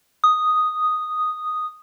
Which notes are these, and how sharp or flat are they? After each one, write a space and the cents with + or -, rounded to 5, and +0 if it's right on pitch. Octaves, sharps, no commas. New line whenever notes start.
D#6 -5